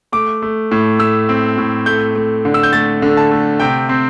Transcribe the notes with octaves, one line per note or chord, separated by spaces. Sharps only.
A3 D6
A3
A2
A3 E6
C4
A2
A3 G6
A3
D3
E6
G6
A3 A6
D3
A5
A3
C3 G5
C4